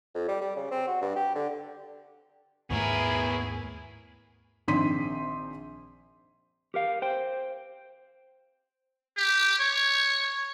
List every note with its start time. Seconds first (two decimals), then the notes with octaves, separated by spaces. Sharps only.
0.15 F2
0.28 G3
0.42 G3
0.56 C#3
0.71 C4
0.87 F#4
1.02 G2
1.16 G4
1.35 D3
2.71 D#2 G#2 A3 B3 E4 G#4 A#4 C#5
4.68 A#1 D#3 C4 C6 B6 D#7
6.74 G4 A#4 F5
7.02 C5 G5
9.17 G4
9.59 C#5